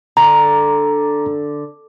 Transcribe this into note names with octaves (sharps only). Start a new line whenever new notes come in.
D3 A#5